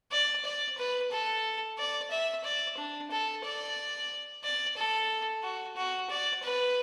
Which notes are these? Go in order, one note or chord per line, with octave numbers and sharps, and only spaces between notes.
D5
D5
B4
A4
D5
E5
D5
D4
A4
D5
D5
A4
F#4
F#4
D5
B4